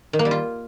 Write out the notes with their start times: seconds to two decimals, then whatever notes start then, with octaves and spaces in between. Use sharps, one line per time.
0.13 D#3
0.19 A#3
0.25 G3
0.31 F4